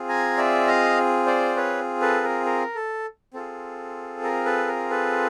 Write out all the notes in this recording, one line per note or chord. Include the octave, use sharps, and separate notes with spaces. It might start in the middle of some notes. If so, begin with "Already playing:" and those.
Already playing: C4 F4 G#4
G#5 A#5
D5 E5
D#5 F5
C5 D5
B4 C#5
A4 B4
A#4
A#4
A4
C4 F4 G#4 A4
A#4
A4 B4
A#4
A4 B4